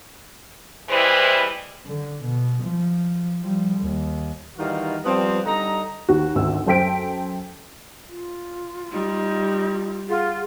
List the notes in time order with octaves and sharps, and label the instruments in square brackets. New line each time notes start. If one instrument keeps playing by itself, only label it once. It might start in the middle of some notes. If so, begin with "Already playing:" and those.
[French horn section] E3 G3 G#3 E4 B4 C5
[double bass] D3
B2
F3
F3 G3
D#2
[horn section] D#3 E3 G3 D#4 F4 F#4
F3 G3 B3 C4
D3 G3 D#4 A#5
[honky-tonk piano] D#2 F#4
G#1 D2 E6
F#2 A4 C5 G5 B6 D7
[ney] F4
[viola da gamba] G3 [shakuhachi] D#4
[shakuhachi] F4 [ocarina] G#4 [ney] F#5